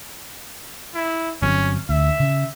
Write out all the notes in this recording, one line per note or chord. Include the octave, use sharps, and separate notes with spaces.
E4
G1 F#3 C4 C#4
D2 E5
C#3